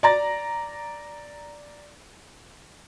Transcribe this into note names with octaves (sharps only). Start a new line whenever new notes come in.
D5 A#5 A6